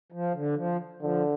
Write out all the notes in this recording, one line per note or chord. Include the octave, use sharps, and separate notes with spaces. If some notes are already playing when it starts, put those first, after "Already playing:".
F3
D3
F3
D3 F3